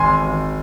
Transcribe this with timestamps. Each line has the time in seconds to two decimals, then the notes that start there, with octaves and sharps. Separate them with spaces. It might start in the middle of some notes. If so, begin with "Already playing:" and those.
Already playing: G#1 G#5 C6
0.22 G#1